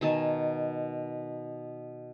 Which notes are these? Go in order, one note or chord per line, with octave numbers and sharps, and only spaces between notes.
B2 D#3 G#5 A5